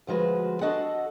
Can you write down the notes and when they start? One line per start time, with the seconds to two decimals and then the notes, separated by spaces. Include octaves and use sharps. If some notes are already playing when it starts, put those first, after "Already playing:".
0.07 D2 F3 G#3 F#4 B4
0.61 D4 F#4 A4 D#5 F#5